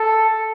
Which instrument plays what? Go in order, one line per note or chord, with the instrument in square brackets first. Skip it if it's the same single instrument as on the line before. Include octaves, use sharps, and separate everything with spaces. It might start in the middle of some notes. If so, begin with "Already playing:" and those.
Already playing: [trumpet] A4